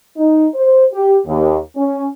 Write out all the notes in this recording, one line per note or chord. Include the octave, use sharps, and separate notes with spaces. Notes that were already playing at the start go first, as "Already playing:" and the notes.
D#4
C5
G4
D#2
C#4